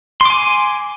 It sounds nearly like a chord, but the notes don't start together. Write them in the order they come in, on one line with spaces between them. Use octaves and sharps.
C6 D6 G#5